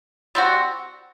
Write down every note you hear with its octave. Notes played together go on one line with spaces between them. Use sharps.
G3 C4 F#4